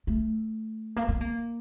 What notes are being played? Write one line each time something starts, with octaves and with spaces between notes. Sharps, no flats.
A3
A#3
C4
A#3